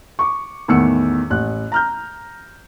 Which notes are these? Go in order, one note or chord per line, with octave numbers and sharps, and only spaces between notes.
C#6 D6
E2 A2 D#3 F#5 E6 C#7
A1 F#6
A#5 F6 G6